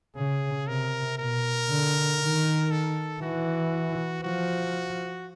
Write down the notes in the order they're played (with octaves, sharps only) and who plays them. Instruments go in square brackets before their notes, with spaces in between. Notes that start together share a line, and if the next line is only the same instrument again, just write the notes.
[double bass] C#3 [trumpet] G#4
[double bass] C3 [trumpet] A#4
[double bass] B2 [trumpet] A#4
[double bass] D3
D#3
[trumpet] A4
[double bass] E3 [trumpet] F#4
[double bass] F3 [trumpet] F#4